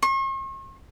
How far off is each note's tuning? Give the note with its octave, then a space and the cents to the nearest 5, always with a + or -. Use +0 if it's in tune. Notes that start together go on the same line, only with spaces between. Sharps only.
C#6 -45